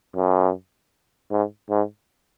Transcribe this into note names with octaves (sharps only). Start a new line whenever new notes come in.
F#2
G#2
G#2